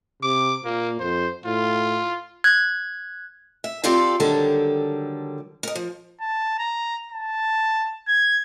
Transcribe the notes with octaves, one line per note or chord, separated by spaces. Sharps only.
C3 D6
A#2 A#3
F2 C5
A2 F4
F#6 G#6
E5
C4 F4 G4 A4 D5 F5
D3 D#3 F#3 G3 A4 A5
A#4 D#5
F3
A5
A#5
A5
G#6